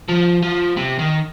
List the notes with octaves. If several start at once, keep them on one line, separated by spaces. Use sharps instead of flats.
F3
F3
C3
D#3